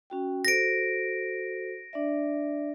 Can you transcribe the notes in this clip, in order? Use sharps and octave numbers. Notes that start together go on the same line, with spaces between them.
C#4 F#4 G5
F#4 A4 C5 A#6 D7
D4 D5 E5